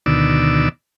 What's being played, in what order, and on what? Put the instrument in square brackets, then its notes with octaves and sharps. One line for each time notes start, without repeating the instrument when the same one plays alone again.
[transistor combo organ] D2 B2 D#3 D5 E6